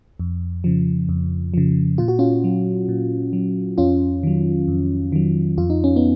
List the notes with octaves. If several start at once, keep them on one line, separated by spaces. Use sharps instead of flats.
F2
C#3 F3
F2
C#3 F3
A#2 F4
F#4
C#4 F4
F#3
A#2
F#3
F2 C#4 F4
D#3 F#3
F2
D#3 F#3
F2 F4
D#4
C#4
B3 D#4